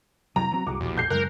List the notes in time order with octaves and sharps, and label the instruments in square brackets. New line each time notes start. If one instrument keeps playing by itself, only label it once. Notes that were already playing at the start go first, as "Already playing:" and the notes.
[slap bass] C3 [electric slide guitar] F#3 [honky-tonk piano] A#5
[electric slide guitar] E3 C4 F#4 [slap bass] F#3
[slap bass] C2 G2 [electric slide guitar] F#4 G#4 [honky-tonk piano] D6
[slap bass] A#1 B2 [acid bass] E2 [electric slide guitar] F#4 G4
[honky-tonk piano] G6 C7
[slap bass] F#2 [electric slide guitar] C#3 G#3 [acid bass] A#4 [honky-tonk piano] F#6